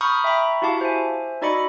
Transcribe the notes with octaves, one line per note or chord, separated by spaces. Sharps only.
A#5 B5 C#6 D#6 F6 G6
E5 G5 A#5 B5 C#6
E4 F#4 G4 F5 A5 D6
C5 E5 G#5
D#4 F#4 D5 D#5 B5 C#7